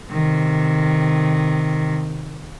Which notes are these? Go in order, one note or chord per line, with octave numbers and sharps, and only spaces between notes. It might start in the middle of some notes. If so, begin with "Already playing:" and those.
C3 D#3